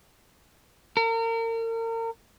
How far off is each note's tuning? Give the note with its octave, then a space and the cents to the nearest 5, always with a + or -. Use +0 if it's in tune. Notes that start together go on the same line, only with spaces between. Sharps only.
A#4 -35